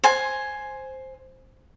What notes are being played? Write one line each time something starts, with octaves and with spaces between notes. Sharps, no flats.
C5 G#5